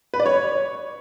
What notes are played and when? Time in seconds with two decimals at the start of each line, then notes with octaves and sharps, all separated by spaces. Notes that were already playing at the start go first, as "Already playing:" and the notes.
0.14 B4
0.20 D5
0.26 C#5